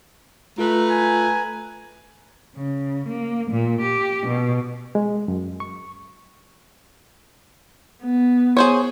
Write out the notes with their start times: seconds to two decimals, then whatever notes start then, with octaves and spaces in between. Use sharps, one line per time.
0.58 A3 F4 B4 A#5
0.90 G#5
2.56 C#3
3.08 A#3
3.51 A#2
3.81 G4
4.27 B2
4.95 G#3
5.28 F#2
5.60 C#6
8.03 B3
8.57 G#4 C5 C#5